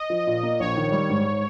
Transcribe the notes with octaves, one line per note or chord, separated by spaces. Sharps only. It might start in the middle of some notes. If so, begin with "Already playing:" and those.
Already playing: D#5
F3
A#2
A#3
A#1 C#5
D#3
G3
G#2